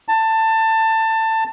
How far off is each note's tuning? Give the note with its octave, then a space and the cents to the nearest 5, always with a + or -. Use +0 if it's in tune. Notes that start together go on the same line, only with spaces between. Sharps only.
A5 +20